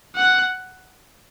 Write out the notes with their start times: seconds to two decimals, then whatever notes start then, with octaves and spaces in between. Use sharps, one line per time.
0.16 F#5